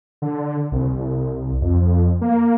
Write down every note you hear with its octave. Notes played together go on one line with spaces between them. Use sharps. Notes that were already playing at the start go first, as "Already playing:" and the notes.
D3
C2
C2
F2
F2
A#3